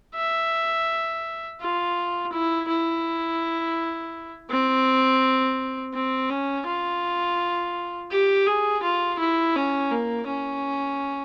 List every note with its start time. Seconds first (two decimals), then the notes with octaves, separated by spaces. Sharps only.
0.16 E5
1.61 F4
2.33 E4
2.69 E4
4.50 C4
5.94 C4
6.30 C#4
6.67 F4
8.11 G4
8.47 G#4
8.83 F4
9.19 E4
9.55 C#4
9.92 A#3
10.28 C#4